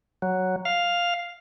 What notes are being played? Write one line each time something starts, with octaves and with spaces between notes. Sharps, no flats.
F#3
F5